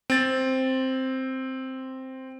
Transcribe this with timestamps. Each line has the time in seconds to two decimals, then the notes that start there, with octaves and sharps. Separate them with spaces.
0.10 C4 A6